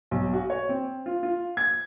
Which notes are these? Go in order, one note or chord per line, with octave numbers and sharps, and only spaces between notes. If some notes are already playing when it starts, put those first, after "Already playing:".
B1
F#4
C#5
C4
F4
F4
G#6